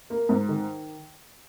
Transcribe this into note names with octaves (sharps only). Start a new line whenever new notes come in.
A#3
G#2
D#3